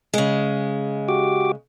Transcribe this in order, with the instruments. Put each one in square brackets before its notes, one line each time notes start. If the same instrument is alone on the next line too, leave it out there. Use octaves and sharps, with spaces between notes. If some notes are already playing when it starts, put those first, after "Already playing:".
[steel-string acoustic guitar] C#3 G#3
[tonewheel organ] F#4 G4 D6